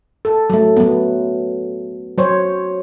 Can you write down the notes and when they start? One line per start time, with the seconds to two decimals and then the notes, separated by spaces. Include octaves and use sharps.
0.25 A4
0.50 F#3 A3
0.77 F#3 B3
2.18 F#3 C5 C#5